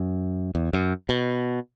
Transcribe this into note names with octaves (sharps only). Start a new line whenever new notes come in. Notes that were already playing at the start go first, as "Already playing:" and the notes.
Already playing: F#2
E2
F#2
B2